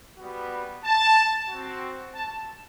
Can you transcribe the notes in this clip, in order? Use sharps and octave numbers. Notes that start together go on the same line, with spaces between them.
G3 B3 F#4
A5
C4 F#4
A5